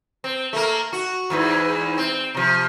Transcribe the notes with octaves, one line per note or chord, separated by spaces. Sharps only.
C4
A3 A#3
F#4
E2 G#2 E3
C4
C3 F3